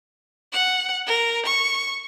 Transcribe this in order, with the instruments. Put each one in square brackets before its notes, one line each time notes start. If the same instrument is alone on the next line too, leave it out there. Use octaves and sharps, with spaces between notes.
[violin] F#5
A#4
C#6